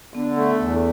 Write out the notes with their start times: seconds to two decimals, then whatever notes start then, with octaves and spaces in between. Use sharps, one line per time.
0.14 D3 B3
0.37 A3
0.60 E2